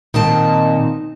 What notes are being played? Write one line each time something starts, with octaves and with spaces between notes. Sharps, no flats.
A#2 D#3 C4 D#4 A5